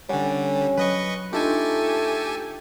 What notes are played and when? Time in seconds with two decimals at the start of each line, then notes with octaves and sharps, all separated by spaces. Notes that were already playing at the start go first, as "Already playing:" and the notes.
0.09 D3 G3 C#4 C#5 F#5 G#5
0.78 F#3 B4 D#5 C#6
1.33 A3 D4 D#4 F4 G4 A4 G#5